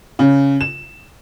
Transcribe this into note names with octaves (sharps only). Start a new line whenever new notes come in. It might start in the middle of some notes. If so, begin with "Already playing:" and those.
C#3
E7